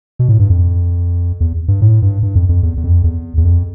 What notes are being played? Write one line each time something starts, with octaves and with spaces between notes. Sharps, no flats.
B2
A2
G2
F2
E2
G2
A2
G2
G2
F2
F2
E2
E2
F2
E2
E2
F2